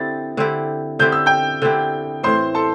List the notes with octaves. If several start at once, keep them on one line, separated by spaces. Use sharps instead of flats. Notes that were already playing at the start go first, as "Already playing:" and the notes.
Already playing: D3 C4 E4 G4 A6
D3 C4 E4 G4
D3 C4 E4 G4 G6
E6
G5 G6
D3 C4 E4 G4
A2 E3 C4 C5 C6
A4 A5